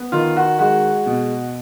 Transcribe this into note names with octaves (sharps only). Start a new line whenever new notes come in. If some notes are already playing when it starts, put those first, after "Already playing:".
Already playing: B3
D#3 F4
F#4
G#3 F#4
B2